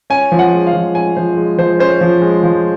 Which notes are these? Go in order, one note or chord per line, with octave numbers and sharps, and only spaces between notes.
C#4 G#5
F3
F#5
G#3
F5
F3
C#4 G#5
F3 C5
G#3
F3 C5
C#4 C5
F3
G#3
F3